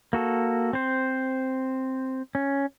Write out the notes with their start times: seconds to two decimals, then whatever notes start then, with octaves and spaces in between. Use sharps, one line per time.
0.13 A#3 F#4 A4
0.73 C4 C5
2.35 C#4